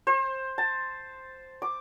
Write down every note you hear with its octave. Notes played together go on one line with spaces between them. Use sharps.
C5
A5
D6